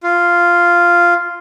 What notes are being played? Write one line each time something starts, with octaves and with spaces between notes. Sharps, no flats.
F4